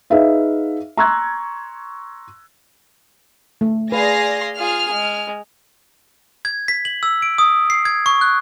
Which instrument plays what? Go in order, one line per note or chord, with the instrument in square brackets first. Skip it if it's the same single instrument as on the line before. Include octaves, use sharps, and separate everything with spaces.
[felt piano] D#4 G#4 B4 E5 F5
A#5 C6 C#6 E6 F#6 G#6
[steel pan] A3
[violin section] G#4 D5 A#6 [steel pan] B4 [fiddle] F5 C6
[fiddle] F4 G#4 [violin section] F6
[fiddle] G#3
[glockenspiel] G#6
B6
F#7
E6
D7
D#6
C7
G#6
C#6
F#6